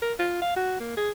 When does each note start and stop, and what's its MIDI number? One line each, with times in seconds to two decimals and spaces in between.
0.02 0.13 70
0.19 0.37 65
0.42 0.52 77
0.56 0.77 66
0.80 0.92 58
0.97 1.11 68